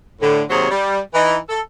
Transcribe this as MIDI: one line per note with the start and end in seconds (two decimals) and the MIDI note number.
0.21 0.43 45
0.21 0.43 50
0.50 0.70 39
0.50 0.70 48
0.50 0.70 54
0.50 0.70 68
0.50 0.70 72
0.50 0.70 73
0.71 1.00 55
1.14 1.36 52
1.14 1.36 63
1.49 1.60 69